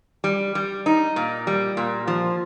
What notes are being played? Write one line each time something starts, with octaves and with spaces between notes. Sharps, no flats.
G3
G3
D#4
A#2
G3
A#2
F3